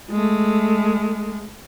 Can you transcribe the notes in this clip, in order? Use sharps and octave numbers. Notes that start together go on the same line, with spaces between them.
G#3 A3